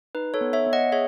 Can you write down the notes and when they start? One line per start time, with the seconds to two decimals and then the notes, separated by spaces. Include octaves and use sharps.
0.15 D#4 B4
0.34 A4 C#5
0.41 B3
0.53 C#5 E5
0.66 B3
0.73 D#5 F#5
0.92 G#4 C#5 E5